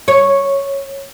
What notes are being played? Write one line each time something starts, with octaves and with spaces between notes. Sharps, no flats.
C#5